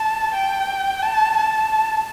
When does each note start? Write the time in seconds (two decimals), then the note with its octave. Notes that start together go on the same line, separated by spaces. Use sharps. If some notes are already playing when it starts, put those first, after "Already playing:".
Already playing: A5
0.34 G5
1.02 A5
1.37 A5